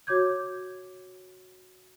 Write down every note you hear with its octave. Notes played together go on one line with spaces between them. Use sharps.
F#4 C#5 D6 G6 G#6